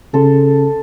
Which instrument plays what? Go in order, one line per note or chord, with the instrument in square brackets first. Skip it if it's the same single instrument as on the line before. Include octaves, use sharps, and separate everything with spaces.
[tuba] C#3 [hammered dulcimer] A4 C6